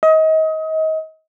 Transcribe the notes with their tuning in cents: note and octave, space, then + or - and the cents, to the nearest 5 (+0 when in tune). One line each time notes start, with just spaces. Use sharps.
D#5 +30